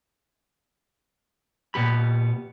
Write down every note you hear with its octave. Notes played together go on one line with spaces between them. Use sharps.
A#2 B3 G4 B5